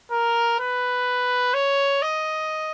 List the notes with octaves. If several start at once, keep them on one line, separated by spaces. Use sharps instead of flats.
A#4
B4
C#5
D#5